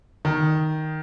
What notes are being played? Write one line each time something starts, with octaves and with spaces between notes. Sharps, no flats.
D#3